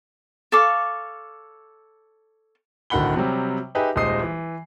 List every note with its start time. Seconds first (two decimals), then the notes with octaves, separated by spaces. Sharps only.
0.52 A4 C#5 F5 D6
2.90 D1 D3 D#3 F#5 B5 G7
3.16 C3 F#3 G3
3.75 D#4 G4 G#4 B4 E5
3.96 D#1 G#3 D#4 C5 D#6 C7
4.22 E3